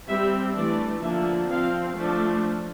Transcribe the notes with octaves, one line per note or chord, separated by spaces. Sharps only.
G3 C4 E5
E3 A3 D4 D5
D3 F3 A#3 D4 E5
F3 C4 F5
F3 A3 D4